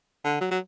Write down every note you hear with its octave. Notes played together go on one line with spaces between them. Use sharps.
D3
F#3
F#3